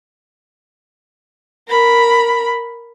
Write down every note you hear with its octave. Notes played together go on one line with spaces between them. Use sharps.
A#4 B5